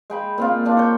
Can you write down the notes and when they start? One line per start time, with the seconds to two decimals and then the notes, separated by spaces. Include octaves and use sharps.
0.10 G#3 G5 B5
0.38 A#2 C4 F4
0.65 D#3 D4 F4
0.77 C#5 G5